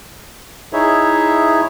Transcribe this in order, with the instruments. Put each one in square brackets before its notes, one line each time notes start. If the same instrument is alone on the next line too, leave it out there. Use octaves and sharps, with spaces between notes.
[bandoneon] D#4 E4 G#4 C#5 E5